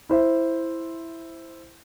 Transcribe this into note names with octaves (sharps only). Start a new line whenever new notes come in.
E4 C5 E5